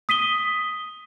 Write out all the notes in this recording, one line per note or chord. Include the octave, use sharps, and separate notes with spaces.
D#6 B6 D#7 G7